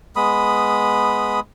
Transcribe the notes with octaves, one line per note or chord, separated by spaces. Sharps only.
G#3 B3 B5 D#6